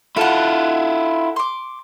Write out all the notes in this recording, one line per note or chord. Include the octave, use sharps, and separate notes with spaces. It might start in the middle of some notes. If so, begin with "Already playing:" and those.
E4 F4 A4 F#5
C6 D6